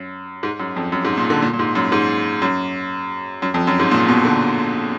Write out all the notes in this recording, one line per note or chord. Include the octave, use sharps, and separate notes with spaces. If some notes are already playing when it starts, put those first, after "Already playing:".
Already playing: F#2
G#2
F#2
F2
F#2
G#2
A#2
D3
A#2
A#2
G#2
F#2
G#2
F#2
F#2
F2
F#2
G#2
A#2
B2
D3